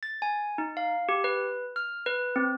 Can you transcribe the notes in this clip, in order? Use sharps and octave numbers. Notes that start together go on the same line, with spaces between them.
A6
G#5
D#4
F5
G4
B4
F6
B4
C4